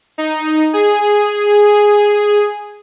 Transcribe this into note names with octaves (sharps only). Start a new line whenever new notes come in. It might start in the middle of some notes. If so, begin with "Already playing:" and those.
D#4
G#4